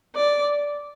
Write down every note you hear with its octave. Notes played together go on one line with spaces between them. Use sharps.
D5